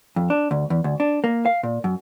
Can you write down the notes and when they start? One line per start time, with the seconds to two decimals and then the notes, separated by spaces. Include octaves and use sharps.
0.16 F2
0.30 D4
0.51 D2
0.70 E2
0.84 D2
1.00 D4
1.24 A#3
1.46 F5
1.63 A#2
1.84 F#2